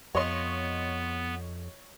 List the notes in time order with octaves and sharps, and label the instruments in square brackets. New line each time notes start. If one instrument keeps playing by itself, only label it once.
[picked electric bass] F2 [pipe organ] B3 [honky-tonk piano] C#5 D#5 C6